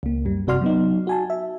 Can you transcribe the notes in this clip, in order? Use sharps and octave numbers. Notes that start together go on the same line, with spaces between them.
C#2 A#3
F#2 G3
G1 C3 F#4 D5 C6 F6
F#3 B3 D#4
F#4 G#5 A5
E5